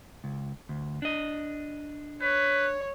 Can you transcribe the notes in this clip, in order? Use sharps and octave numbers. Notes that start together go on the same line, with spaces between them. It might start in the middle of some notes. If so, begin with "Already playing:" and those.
C#2
D2
D4 D#5
B4 C#5